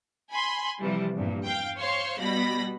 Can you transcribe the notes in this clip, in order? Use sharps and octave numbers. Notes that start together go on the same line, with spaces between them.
G#5 B5 C6
C3 E3 F3 G3
E2 G2 A#2
F5 G5
C5 C#5 F5 C6 C#6
B2 G3 B5 A#6